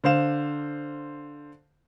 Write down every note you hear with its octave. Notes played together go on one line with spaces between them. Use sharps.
D3 C5 F5 E7